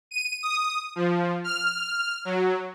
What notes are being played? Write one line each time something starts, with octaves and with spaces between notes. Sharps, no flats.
D#7
D#6
F3
F6
F#3